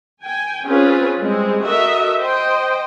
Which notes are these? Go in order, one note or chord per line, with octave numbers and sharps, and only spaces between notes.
G5 G#5
C4 C#4 F4 G#4 B4
G3 G#3 C4
F#4 A4 A#4 D#5 E5
C5 D#5 G5